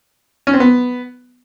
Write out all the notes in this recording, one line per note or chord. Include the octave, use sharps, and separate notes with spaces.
C#4
C4
B3